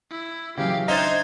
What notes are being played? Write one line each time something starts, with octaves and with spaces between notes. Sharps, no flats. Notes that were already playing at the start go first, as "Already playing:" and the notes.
E4
C#3 E3 F#3 G4 F5
D4 D#4 C5 D#5 E5 G#6 A6